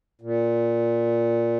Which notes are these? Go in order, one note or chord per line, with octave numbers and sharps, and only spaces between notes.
A#2